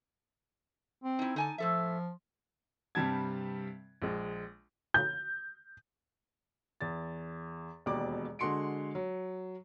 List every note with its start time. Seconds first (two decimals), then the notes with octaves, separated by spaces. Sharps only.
1.04 C4
1.19 D#4 E4
1.36 D3 D#4 G#5 A5
1.58 A2 F3 A4 E5
2.95 G2 C3 G3 A5 G#6
4.02 A#1 G#3
4.94 G6
6.81 E2 A6
7.86 E1 D#2 B2 D5 D6
8.39 D3 G#3 F#4 C6 C#7 D7
8.95 F#3